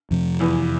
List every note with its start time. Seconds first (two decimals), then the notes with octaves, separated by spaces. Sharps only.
0.11 F2 C3 F3
0.40 E2 E3